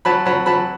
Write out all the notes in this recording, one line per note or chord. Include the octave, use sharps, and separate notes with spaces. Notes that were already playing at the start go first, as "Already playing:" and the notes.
F#3 A5 B5
F#3 A5 B5
F#3 A5 B5